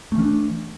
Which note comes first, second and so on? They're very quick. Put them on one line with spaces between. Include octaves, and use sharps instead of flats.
A3 E3 C#4 D4